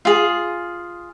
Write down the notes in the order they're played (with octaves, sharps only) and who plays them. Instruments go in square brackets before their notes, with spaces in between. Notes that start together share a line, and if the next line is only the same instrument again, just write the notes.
[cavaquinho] F4 G#4